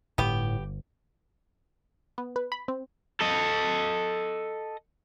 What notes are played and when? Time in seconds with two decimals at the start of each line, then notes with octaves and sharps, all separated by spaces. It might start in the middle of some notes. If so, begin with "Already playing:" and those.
0.18 G1 A2 B3 G4
2.18 B3
2.36 B4
2.52 B5
2.68 C4
3.21 A4 D#5